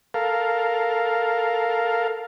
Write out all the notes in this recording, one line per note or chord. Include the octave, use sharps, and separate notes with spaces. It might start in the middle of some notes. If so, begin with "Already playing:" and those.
A4 A#4 F5